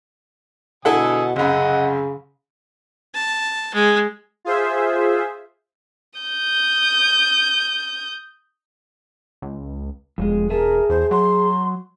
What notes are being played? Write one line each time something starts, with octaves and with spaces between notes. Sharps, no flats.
B2 D3 E4 A4 F#5 G#5 D#6
C2 F#2 C#3 D#5 F#5
A5
G#3
F4 G#4 C5 E5
D#6 G6
C#2
E1 F2 G#3
G#4 A#4 E5 A5
E2 C5
F#3 C6